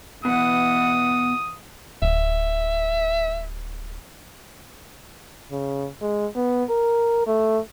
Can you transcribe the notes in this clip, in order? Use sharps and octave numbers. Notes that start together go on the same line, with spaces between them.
B2 E3 F#5 D#6
D1 E5
C#3
G#3
B3
A#4
A3